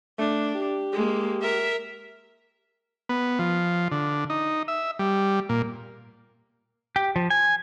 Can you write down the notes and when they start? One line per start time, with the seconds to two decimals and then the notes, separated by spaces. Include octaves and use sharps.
0.19 A3 D4
0.55 G4
0.93 G#3 A#3
1.42 A#4 E5
3.09 B3
3.39 F3
3.91 D3
4.30 D#4
4.68 E5
4.99 G3
5.49 A#2
6.96 G4
7.16 F3
7.30 G#5